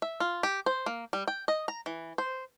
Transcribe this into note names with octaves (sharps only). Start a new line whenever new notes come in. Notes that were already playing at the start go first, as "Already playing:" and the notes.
E5
F4
G4
C5
A#3
G3
G5
D#5
A#5
E3
C5